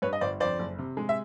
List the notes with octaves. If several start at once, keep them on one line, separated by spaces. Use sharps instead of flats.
G2 B4 C#5
D#5
G1 C5 D5
F2 C5 D5
F#1
C3
G#3
E5